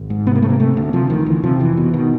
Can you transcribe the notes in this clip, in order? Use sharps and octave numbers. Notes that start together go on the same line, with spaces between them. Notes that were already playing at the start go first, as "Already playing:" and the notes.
Already playing: G#1
G#2
C3 B3
A#3
C3 A3
A#3
C3 A3
D2
C3 F3
D2 D#3
D2 E3
C3 F3
F1 E3
B2
B2 D#3